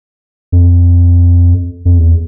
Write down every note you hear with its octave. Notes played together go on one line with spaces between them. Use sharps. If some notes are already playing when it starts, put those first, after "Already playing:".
F2
F2
E2